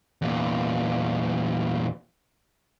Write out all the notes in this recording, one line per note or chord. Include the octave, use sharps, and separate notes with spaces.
E2 A#2